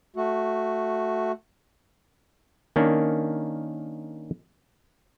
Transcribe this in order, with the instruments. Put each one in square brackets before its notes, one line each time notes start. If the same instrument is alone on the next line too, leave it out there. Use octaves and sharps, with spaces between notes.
[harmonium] A3 F#4
[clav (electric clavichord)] D#3 A#3 C#4 D4